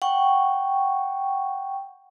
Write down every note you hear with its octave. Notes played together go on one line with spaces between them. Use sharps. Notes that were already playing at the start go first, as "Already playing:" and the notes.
F#5 G5 C#6